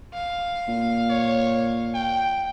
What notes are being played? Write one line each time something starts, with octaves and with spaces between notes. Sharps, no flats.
F5
A#2
C#5
G5